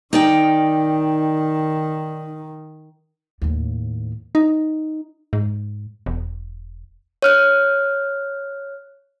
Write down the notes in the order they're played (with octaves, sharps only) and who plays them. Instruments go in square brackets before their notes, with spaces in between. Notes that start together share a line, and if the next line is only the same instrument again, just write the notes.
[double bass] D#3 [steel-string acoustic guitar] D#4 D5 G5
[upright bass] D#2 A2
[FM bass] D#4
G#2
E1
[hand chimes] C#5 F6 F#6